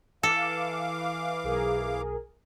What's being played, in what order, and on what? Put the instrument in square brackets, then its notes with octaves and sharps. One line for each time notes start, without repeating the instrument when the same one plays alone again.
[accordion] E3 F5 D6 [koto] A4
[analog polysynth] B1 G#4 A#4